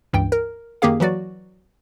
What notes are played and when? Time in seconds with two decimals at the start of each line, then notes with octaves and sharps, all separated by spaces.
0.13 C#2 G2 E3 G5
0.32 A#4
0.82 F#2 D#3 A#3 G4 G#4 F5
1.00 E3 F#3 F#4 D5